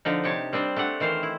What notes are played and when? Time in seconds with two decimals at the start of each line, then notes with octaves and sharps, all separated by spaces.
0.05 D3 F3 D#4
0.24 C3 G4 C#5 A5
0.53 G3 C4 D4 C5
0.76 A3 D4 G4 F#5
1.00 D#3 E3 C5 F5
1.23 E4